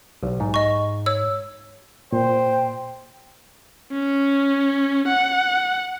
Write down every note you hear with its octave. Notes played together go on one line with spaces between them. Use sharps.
B1
G#2
D#5 C#6
C#5 E6
A#2 C5 G5
C#4
F#5